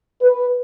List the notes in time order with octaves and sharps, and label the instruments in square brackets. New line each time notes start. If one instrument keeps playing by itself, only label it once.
[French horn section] B4